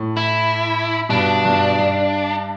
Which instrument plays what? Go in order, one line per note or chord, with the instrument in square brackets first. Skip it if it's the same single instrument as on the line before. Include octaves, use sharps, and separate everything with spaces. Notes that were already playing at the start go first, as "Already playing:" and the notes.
Already playing: [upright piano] A2
[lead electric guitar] E4
[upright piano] G2 B2 [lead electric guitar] D4
[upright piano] G2 B2
G2